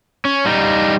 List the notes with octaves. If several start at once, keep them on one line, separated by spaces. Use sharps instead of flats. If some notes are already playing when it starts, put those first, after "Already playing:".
C#4
G3 D#4